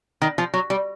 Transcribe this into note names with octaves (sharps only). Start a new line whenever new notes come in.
D#3
F3
F#3
G3